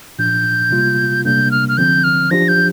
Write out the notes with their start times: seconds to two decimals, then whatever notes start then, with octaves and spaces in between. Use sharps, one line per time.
0.19 A#2 F3 D4 G6
0.71 C3 G3 A#3 F4
1.25 C3 G3 A#3 D4 G6
1.51 F6
1.69 F6
1.77 D3 F3 C4 G6
2.04 F6
2.31 F3 D4 G4 A#6
2.48 G6